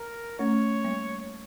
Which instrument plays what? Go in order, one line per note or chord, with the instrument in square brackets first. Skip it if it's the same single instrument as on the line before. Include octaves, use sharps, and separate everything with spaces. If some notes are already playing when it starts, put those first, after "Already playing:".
Already playing: [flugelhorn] A#4
[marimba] A3 C#4 [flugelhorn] C#5
[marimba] G3 A#3